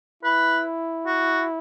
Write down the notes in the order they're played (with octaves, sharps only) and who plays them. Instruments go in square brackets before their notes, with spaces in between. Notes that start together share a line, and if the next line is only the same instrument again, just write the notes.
[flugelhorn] E4 [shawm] B4
[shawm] F#4